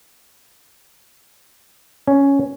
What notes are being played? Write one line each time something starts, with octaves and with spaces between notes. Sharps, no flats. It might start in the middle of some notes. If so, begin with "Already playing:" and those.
C#4